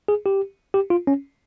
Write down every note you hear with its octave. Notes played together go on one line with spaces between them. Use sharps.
G#4
G4
G4
F4
C#4